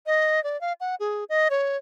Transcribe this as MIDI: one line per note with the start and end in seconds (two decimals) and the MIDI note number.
0.06 0.42 75
0.44 0.59 74
0.61 0.73 77
0.80 0.95 78
1.00 1.24 68
1.29 1.48 75
1.50 1.77 73